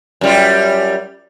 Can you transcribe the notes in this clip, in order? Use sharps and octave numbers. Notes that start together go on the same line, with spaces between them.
F#2 G3 F4